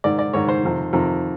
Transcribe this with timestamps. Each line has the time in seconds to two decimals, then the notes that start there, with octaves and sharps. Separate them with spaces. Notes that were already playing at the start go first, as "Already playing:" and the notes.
0.04 G#2 D#3 D5
0.19 D5
0.33 G#2 D#3 C#5
0.49 C5
0.63 F2 C3 D#3
0.93 F2 C3 D#3